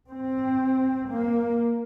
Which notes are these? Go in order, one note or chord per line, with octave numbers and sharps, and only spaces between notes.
C4
A#3